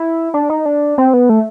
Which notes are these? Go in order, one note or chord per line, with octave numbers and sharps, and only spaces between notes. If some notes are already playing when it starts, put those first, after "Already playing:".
Already playing: E4
D4
D#4
D4
C4
B3
A3